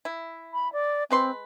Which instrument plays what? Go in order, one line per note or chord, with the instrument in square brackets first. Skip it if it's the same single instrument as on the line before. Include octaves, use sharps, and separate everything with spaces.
[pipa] E4
[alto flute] B5
D5
[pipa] G#3 B4 C6 [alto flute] C4